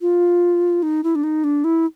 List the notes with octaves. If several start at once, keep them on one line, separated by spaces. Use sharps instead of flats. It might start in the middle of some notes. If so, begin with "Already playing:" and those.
F4
D#4
E4
D4
D#4
D4
E4